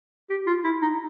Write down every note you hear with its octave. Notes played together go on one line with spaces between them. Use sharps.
G4
F4
E4
D#4